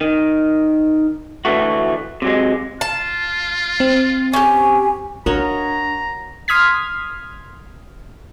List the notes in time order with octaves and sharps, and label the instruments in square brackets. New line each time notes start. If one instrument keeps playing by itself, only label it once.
[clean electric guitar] D#3
D2 G2 E3 A3 F#4
C3 F#3 G#3
[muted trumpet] F4 [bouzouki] A5
[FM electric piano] C4
[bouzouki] C#4 G4 [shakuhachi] G#5
[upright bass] D4 [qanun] F#4 C#5 D#5 [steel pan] A#4 [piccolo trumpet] A#5
[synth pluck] C6 D#6 F6 G#6 B6